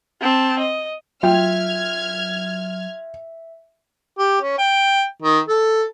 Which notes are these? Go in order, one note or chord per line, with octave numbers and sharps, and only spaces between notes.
C4 A5
D#5
F#3 F4 E5 G5 F6 G#6
G4
C#4
G5
D#3
A4